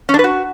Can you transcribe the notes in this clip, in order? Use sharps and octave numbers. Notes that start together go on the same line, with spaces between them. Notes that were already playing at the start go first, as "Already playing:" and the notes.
C#4
D4
B4
F#4